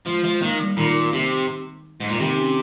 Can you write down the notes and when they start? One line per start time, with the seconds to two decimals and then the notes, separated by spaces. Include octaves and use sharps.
0.06 F3 G#3
0.24 F3 G#3
0.42 D#3 A#3
0.59 G3
0.77 A#2 D#3 D#4
1.13 C3
2.00 G#2
2.10 A#2
2.19 C3 D#3 D#4
2.37 C#4